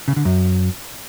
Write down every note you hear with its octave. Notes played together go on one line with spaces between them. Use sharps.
C#3
D3
F#2